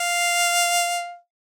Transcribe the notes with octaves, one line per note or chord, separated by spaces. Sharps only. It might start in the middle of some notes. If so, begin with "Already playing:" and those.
Already playing: F5